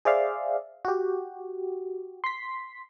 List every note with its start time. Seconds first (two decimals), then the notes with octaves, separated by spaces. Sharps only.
0.05 G#4 C5 D5 E5 F5
0.85 F#4 G4
2.24 C6 B6